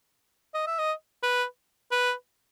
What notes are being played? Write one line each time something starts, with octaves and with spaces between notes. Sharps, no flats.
D#5
E5
D#5
B4
B4